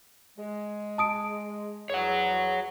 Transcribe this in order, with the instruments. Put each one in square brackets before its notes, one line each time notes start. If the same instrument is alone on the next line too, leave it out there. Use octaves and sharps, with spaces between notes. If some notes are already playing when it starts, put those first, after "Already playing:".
[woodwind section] G#3
[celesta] A5 D#6 D7
[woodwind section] E2 G#4 [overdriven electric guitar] C#5 F#5